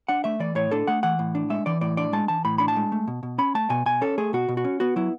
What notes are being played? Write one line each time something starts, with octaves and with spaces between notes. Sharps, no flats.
D4 F#5
A3 E5
E3 D5
A2 C#5
D4 A4
A3 F#5
E3 F#5
A2
D4
G#3 E5
E3 D5
A2 D5
D4 D5
G#3 A5
E3 A5
A2 B5
D4 B5
A5
G#3
A3
B2
B2
C#4 B5
A3 A5
B2 G#5
B2 G#5
C#4 A4
A3 G#4
B2 F#4
B2
F#4
C#4
B3 F#4
F#3 E4